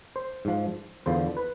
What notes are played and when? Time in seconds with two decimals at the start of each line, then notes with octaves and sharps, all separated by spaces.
0.16 C5
0.45 G#2 F3
1.06 E2 D3 F3 C5
1.37 B4